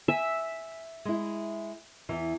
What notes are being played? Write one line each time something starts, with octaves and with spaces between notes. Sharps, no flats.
E5 G#5
G#3 E4
E2 E3